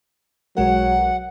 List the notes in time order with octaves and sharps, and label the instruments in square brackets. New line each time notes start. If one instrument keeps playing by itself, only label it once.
[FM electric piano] B1 G#3 A#4 [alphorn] F#3 [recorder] F#5